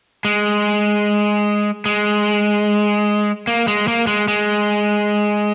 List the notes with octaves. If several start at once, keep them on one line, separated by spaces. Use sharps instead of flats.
G#3
G#3
A#3
G#3
A#3
G#3
G#3